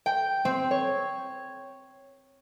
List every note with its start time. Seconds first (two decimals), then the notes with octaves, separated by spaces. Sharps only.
0.06 G5
0.45 C4
0.71 C#5